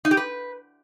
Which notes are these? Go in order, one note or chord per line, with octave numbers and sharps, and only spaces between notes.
D#4
G4
B4